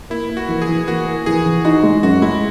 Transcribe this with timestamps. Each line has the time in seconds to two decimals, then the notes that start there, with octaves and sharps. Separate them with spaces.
0.10 A#3 E4
0.30 A#3
0.37 F#4
0.49 E3
0.62 G#4
0.69 E3
0.87 A#3 F#4
1.07 A#3
1.26 E3 G#4
1.46 E3
1.65 D#4 F#4
1.83 G#3
2.03 F#2 F#4
2.22 G#3 E4